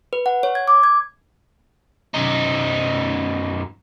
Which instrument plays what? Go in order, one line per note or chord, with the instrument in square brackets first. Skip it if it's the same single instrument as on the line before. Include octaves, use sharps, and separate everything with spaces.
[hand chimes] B4
F#5
C#5
G#6
D6
G#6
[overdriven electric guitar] F#2 D#4